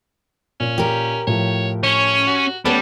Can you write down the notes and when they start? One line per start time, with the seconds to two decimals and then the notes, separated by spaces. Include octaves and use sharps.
0.60 A#2 C#4
0.78 G4 A#4
1.27 A2 F3 C#5
1.83 C#4 C#5
2.27 F#4
2.65 G3 A3 B3 C#4 B4 C#5 F#5 A5